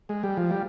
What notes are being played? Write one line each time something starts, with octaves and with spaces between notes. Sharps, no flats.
G#3
G3
F3
G3